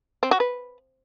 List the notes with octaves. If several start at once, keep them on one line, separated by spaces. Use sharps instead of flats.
C4
F#4
B4